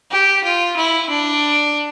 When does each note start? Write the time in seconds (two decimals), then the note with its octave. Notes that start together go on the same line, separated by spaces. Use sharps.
0.11 G4
0.44 F4
0.76 E4
1.09 D4